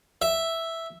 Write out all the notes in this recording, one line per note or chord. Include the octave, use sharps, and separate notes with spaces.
E5